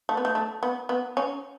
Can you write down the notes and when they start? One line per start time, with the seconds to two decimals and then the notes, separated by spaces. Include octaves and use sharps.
0.09 A3
0.17 B3
0.25 A3
0.35 A3
0.63 B3
0.89 B3
1.17 C#4